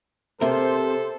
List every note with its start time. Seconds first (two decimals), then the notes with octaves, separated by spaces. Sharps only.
0.41 C3 G4 A4 A#4 C5 E5